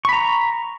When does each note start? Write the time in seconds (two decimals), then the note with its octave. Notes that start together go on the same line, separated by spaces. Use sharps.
0.05 C#6
0.09 B5
0.13 A#5